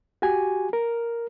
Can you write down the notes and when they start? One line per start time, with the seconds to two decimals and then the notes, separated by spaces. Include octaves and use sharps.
0.22 F#4 G4 G#5
0.73 A#4